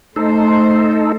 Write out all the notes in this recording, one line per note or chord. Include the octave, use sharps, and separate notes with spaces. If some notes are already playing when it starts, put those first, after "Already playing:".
A3 D#4 A4 C5